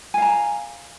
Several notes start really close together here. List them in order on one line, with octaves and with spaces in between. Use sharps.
G#5 F5 A#5